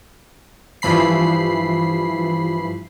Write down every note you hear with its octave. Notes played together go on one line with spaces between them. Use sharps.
G2 E3 F3 B5 C7